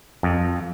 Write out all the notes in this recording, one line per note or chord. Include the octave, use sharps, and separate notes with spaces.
F2